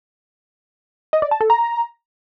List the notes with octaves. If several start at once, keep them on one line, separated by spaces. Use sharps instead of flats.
D#5
D5
A5
A4
A#5